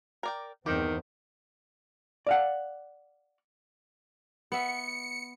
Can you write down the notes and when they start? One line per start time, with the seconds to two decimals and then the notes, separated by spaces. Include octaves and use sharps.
0.23 A#4 D5 G5
0.66 E2 G2 D#3 C4 G4
2.27 D5 F5 F#5
4.52 B3 E5 C#7